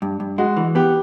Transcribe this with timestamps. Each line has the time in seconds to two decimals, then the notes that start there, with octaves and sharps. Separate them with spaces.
0.02 G2
0.20 G2
0.38 G#3 F#4
0.57 E3
0.75 B3 G4